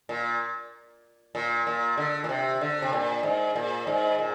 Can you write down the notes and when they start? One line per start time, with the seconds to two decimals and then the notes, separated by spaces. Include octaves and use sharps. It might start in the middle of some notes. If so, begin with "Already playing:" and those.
0.09 A#2
1.35 A#2
1.67 A#2
1.98 D3
2.24 A#2
2.29 C3
2.61 D3
2.82 C3
2.93 A#2
3.23 G#2
3.56 A#2
3.87 G#2
4.18 A#2